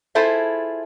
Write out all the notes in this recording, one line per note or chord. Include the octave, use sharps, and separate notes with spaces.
E4 F4 G#4 A4 C5 E5